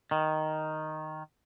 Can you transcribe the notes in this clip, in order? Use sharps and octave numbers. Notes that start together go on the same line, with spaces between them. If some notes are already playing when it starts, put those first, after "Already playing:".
D#3